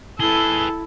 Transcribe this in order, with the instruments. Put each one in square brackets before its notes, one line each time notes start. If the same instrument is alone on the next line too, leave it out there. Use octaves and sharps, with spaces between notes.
[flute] E4 [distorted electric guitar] G#4 B4 [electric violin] A4 [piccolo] G7